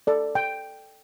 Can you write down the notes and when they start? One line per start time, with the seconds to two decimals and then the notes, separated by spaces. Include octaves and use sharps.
0.07 A4 D5
0.35 G5